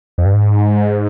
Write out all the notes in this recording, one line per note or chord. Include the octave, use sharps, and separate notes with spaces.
F2
G2
G#2